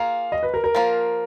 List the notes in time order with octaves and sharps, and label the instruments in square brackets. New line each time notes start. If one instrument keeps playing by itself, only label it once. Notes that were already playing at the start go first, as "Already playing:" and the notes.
Already playing: [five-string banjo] A#3 F4 G#4 [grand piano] F5
[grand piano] D#5
B4
A#4
A#4
[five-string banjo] F3 A#3 F4